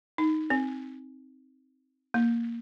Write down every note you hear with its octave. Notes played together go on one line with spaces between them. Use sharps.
D#4
C4
A#3